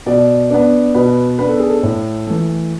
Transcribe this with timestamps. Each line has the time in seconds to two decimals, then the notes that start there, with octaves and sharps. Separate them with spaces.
0.06 B2 D5
0.50 B3 D4
0.94 B2 B4
1.38 B3 D4 B4
1.49 A4
1.60 G#4
1.70 A4
1.83 A2
2.27 E3 A3